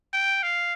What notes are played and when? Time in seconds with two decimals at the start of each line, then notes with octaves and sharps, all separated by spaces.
0.13 G5
0.43 F5